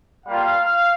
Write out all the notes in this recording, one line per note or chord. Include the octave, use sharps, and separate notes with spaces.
G3 A#3 F4 F5